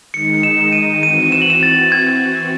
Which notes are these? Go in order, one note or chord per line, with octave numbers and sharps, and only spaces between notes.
D#3 G#3 D#4 C#7
E7
D#7
E3 C4 F#4 D#7
E7
F#7
E7
A6
G#6